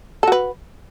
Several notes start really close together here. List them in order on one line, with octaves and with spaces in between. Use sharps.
A4 F#4 B4